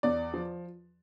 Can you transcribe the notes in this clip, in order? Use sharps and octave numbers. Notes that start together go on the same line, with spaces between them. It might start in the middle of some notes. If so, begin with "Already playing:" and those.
E2 D5
F3